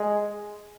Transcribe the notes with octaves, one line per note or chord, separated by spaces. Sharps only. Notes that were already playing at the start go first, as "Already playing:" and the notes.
Already playing: G#3